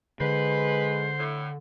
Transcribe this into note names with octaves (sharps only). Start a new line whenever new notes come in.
D3 G#3 B4 C5
A2